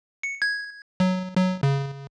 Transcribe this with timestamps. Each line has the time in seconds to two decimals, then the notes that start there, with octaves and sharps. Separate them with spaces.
0.23 C#7
0.42 G#6
1.00 F#3
1.37 F#3
1.63 C#3